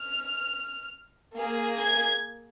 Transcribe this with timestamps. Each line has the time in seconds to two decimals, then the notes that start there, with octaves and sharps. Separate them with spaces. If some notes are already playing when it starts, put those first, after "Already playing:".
Already playing: F6
1.37 A#3 G#4
1.79 G#6